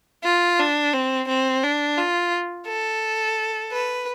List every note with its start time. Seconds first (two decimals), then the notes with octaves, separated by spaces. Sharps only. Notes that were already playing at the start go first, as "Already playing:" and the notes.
0.24 F4
0.59 D4
0.93 C4
1.28 C4
1.63 D4
1.97 F4
2.68 A4
3.72 B4